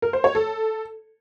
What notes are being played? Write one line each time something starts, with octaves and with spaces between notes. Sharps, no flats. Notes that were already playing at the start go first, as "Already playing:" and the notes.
A#4
C5
C#5
A4